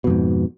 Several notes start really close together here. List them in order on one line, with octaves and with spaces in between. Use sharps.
B2 F2 G#2